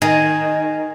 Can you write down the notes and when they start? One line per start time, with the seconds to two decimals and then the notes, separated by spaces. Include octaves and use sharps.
0.02 D#3 G#4